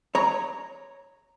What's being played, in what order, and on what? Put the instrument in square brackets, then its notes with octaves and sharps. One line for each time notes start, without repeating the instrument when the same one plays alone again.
[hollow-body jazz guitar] C#5 A#5